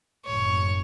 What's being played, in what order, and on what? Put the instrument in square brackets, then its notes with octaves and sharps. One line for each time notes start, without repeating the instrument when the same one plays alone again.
[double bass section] F#1 A2 [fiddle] C#5